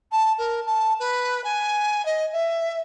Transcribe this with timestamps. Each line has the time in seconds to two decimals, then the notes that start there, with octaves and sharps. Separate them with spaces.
0.12 A5
0.38 A#4
0.66 A5
0.99 B4
1.44 G#5
2.05 D#5
2.33 E5